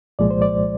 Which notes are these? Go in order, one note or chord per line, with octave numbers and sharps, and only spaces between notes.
C2 A#2 F3 G#3 D5
C5
D5